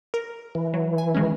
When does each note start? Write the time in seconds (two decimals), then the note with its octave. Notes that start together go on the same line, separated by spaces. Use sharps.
0.14 A#4
0.55 E3
0.74 F#3
0.98 G#5
1.14 D#3 G#3 C#4